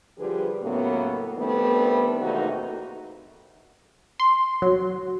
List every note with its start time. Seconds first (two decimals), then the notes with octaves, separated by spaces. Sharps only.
0.18 D3 F3 G3 G4 G#4 B4
0.62 A2 C#3 F#3 A#3 B3
1.37 D#3 G3 A3 B3 C4 D4
2.20 E2 C3 A3 A#3 D#4 F#4
4.20 C6
4.62 F#3